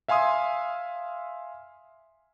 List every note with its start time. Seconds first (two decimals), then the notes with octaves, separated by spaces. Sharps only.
0.08 E5 F5 G#5 C6 D#6